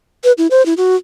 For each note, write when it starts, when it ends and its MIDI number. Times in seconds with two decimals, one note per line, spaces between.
0.24 0.32 71
0.38 0.47 64
0.51 0.64 72
0.66 0.74 64
0.77 0.96 66